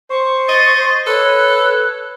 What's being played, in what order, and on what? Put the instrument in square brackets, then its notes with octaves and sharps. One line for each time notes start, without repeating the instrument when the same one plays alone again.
[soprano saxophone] C5 [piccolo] C#6
[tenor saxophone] D#5 [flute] A6
[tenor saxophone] A4 [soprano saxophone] B4 [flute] C#5 [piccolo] F#6